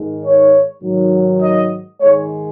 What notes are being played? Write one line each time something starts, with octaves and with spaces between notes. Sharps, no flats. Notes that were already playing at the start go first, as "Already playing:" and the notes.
Already playing: G#2 D#3 G#3
C#5
G#2 D#3 F#3
D#5
G#2 D#3 G#3 C#5